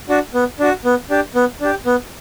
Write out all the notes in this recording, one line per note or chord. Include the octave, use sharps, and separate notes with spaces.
D4 F#4
B3
D4 F#4
B3
D4 G4
B3
D4 G4
B3